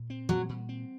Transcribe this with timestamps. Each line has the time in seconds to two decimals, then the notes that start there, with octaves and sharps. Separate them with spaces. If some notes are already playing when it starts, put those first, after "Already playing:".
Already playing: A#2
0.10 C4
0.29 A#2 F#3
0.49 A#2
0.69 C4